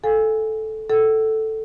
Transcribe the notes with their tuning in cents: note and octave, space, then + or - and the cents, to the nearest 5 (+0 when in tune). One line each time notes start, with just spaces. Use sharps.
A4 -10 F5 +40 G#5 -20
A4 +0 F#5 +45